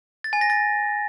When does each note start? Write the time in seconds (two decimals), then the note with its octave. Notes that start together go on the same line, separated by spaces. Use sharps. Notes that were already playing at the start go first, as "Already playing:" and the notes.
0.24 A6
0.33 G#5
0.41 A#6
0.50 A6